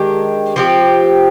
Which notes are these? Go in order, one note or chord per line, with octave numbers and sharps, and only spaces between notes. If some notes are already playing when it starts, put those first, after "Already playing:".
Already playing: D#3 G#3 D4 G4
F3 C4 G4